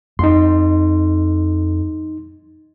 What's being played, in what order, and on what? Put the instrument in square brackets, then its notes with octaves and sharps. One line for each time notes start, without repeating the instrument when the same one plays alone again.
[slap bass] F2 [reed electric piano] D#4 C6